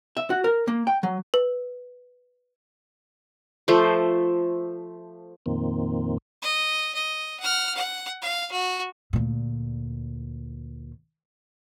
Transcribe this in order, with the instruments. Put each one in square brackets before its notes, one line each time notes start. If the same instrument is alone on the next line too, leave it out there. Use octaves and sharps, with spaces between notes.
[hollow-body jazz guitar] E5
F#4
A#4
A#3
G5
F#3
[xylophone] B4
[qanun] F3 A3 C5
[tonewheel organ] F2 A#2 D#3 A#3 C4
[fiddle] D#5
D#5
F#5 F6
F#5
F5
F#4
[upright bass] D2 A#2